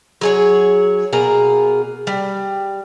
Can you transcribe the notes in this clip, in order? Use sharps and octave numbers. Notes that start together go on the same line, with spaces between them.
F#3 G#4 C#5
B2 A#3 G#4 A#5
G3